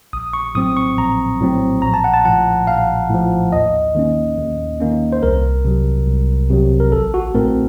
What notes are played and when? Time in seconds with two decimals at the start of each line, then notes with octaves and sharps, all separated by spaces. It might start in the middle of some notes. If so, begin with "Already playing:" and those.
0.13 A#1 D#6
0.33 C#6
0.55 A2 F#3 C4 D#6
0.77 C#6
0.97 A#1 A#5
1.41 A2 F#3 C4
1.82 A#1 A#5
1.94 A5
2.04 F#5
2.14 A5
2.25 A2 F3 F#5
2.67 A#1 F5
3.10 A2 F3
3.52 D#2 D#5
3.95 D#3 A#3 C#4
4.38 D#2
4.80 D#3 A#3 C#4
5.13 C5
5.23 C2 A#4
5.65 C3 F#3
6.08 C2
6.50 C3 F#3
6.80 A#4
6.92 A1 A4
7.14 F#4
7.35 A2 A3 C4 A#4